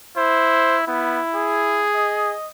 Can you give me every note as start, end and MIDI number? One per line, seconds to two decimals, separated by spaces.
0.17 0.84 64
0.17 0.78 72
0.88 1.20 59
0.88 1.88 64
1.35 2.35 68
1.95 2.48 75